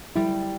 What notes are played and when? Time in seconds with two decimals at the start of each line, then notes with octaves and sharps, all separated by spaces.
0.16 G3 E4